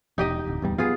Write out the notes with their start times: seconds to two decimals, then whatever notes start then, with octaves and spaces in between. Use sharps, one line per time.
0.18 E1 D#4 G4 D#5
0.47 D1
0.62 D1 E2 G3
0.78 B3 F4 G#4